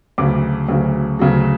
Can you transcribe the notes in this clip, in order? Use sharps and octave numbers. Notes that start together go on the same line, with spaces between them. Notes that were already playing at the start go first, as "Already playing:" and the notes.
D2 C#3 F#3 D6
D2 C#3 F#3
D2 C#3 F#3